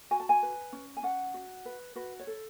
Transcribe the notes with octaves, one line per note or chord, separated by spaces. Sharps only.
F#4 G#5
A5
G#5
B4
C#4
G#5
C#4 F#5
F#4
B4
F#4 B4
C#5
A4